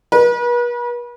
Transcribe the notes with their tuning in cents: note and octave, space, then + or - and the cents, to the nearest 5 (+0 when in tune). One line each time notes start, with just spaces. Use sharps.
B4 -40